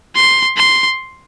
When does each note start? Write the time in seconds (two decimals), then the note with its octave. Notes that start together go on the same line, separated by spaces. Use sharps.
0.15 C6
0.57 C6